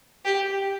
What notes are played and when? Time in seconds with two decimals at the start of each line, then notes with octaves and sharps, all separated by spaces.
0.25 G4